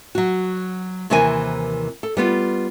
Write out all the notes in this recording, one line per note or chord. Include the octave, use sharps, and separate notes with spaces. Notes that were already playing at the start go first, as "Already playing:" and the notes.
F#3 F#4
D#2 C3 E3 C4 A#4 G#5
A4
G3 B3 F4